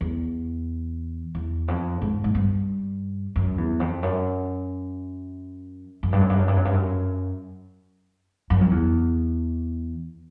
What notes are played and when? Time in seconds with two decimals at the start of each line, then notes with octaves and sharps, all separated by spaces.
0.01 E2
1.35 E2
1.68 F2
2.02 G#2
2.24 G#2
2.35 G2
3.36 F#2
3.58 E2
3.80 F2
4.03 F#2
6.03 F#2
6.12 G2
6.21 F#2
6.30 G2
6.39 F#2
6.48 G2
6.56 F#2
6.65 G2
6.74 F#2
8.50 F#2
8.61 F2
8.71 E2